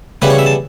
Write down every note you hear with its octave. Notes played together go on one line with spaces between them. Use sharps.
C#3 E3 G3 B3 B4
C#5
E5
A5